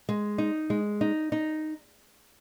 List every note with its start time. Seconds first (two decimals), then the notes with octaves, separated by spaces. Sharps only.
0.09 G#3
0.38 D#4
0.70 G#3
1.01 D#4
1.32 D#4